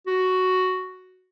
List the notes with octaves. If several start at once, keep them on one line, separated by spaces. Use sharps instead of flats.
F#4